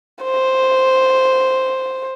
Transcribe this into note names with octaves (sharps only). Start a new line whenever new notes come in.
C5